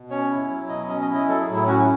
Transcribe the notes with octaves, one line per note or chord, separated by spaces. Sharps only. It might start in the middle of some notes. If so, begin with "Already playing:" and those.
Already playing: B2
C#4 C#5
E4
F#3
B2 D#5
C#4 D#5
D#5
E4
D#5
F#3 A4
G#4
A2
E4
C#4 F#4
E4